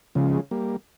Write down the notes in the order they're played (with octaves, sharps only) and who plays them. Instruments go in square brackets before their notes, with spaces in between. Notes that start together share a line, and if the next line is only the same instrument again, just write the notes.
[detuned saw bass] C#3 [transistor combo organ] F3 G#3
[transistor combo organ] G3 A#3